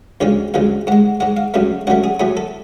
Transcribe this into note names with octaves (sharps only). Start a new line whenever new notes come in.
D2 C#3 F3 G#3 C#5
D2 C#3 F3 G#3 F5
G#2 G#3 F#5
G#2 G#3 F#5
F5
C#2 C#3 F#3 A3 F5
C#2 C#3 F#3 A3 F#5
G#4
A2 F#3 A3 G#4
A4